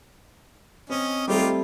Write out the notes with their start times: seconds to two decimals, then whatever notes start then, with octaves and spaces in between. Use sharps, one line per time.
0.90 C4 C#4 D#5
1.28 G3 A3 C4 D#4 F4 G4